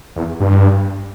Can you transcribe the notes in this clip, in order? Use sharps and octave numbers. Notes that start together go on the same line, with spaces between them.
E2
G2